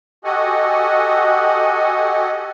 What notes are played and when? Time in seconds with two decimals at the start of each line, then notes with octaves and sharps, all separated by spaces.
0.24 F#4 G4 A4 D#5 F#5 G#5